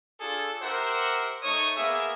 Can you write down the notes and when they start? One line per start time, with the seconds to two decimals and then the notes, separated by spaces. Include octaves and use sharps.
0.21 D4 F4 G#4 A4
0.62 G4 A#4 C5 E5 F#5
1.43 A3 D#4 C#5 C#6 D#6
1.76 A#3 B3 G#4 E5